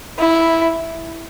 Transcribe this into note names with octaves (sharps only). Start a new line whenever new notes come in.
E4